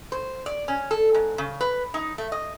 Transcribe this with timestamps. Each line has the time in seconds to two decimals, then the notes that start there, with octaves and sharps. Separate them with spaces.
0.12 C5
0.46 D5
0.68 C#4
0.91 A4
1.14 G#2
1.38 C#3
1.61 B4
1.94 D#4
2.18 A3
2.32 D#5